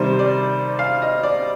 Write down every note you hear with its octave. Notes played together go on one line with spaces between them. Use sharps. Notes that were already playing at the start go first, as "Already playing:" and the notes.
Already playing: C3 D#3 G3 C5
D5
F5
D#5
D5